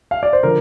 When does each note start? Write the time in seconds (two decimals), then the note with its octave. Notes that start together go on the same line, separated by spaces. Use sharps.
0.11 F5
0.23 D5
0.33 C5
0.43 D3 F3 A#4